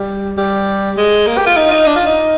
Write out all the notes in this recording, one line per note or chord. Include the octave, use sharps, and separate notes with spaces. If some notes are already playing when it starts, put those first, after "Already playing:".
Already playing: G3
G3
G#3
A#3
G4
F4
D#4
F4
D#4
D4
F4
D#4